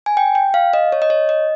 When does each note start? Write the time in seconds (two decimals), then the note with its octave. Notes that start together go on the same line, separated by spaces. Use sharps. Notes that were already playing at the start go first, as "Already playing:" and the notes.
0.06 G#5
0.17 G5
0.35 G5
0.54 F5
0.73 D#5
0.92 C#5
1.02 D#5
1.10 C#5
1.29 D#5